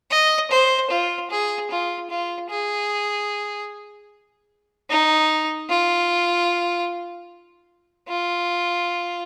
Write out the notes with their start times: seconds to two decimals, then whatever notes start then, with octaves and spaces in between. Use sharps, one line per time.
0.11 D#5
0.51 C5
0.91 F4
1.31 G#4
1.70 F4
2.10 F4
2.50 G#4
4.90 D#4
5.69 F4
8.08 F4